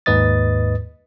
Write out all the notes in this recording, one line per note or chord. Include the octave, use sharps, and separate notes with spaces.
D#2 G#2 B4 D#5 D#6 A6